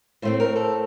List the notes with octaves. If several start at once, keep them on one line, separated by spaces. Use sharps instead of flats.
A2 A3 C4 C5
A#4
A4